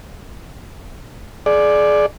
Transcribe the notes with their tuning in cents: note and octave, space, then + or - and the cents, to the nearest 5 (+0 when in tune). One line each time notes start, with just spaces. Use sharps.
G#4 +30 D5 +5